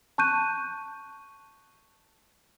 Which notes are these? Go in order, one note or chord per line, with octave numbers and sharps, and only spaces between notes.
A5 C#6 F#6 G6 D#7